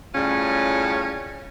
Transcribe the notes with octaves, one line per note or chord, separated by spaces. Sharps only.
A2 C#3 G3 C#4 F4